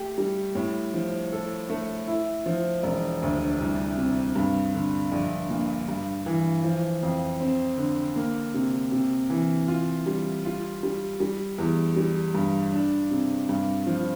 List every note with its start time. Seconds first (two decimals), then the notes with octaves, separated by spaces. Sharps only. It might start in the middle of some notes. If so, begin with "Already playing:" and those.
Already playing: A3 G4
0.18 G3
0.55 A2
0.94 F3
1.32 A4
1.69 A3
2.07 E4
2.46 F3
2.83 E1
3.22 D2
3.60 C2
3.97 C3
4.36 G2
4.74 D3
5.12 A#1
5.50 A#2
5.89 G2
6.26 E3
6.64 F3
7.03 F2
7.40 C4
7.78 D3
8.16 A#3
8.54 C3
8.92 C3
9.30 E3
9.68 F4
10.06 G3
10.45 F4
10.83 G3
11.20 G3
11.58 E2
11.96 G3
12.35 G2
12.72 D4
13.11 C3
13.49 G2
13.86 F3